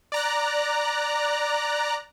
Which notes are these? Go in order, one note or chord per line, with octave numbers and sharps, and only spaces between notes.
D5 A#5 F#6